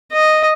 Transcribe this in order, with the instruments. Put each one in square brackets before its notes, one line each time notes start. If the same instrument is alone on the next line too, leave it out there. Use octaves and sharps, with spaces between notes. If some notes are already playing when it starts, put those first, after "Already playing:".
[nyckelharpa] D#5